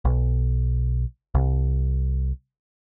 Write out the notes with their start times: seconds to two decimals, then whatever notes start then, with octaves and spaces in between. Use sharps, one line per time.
0.05 B1
1.35 C2